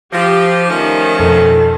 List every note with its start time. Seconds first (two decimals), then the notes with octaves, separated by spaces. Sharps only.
0.13 F3 G4 E6 G6 A#6
0.70 D#3 F3 A3 C#4
1.20 F2 B2 A4